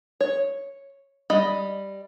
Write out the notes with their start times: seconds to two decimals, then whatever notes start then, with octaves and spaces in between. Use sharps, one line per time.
0.21 C#5
1.30 G3 D#5 B5